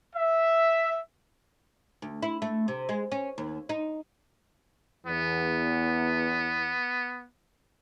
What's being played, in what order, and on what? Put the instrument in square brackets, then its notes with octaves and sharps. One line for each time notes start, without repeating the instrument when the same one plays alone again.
[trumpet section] E5
[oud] D2
E4
A3
C3
G#3
C#4
D#2
D#4
[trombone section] E2 [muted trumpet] B3